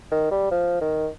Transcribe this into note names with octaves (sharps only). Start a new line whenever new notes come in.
D#3
G3
F3
D#3